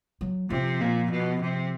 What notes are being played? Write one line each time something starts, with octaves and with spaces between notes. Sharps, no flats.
F#3
C3 F3
A#2
B2
C3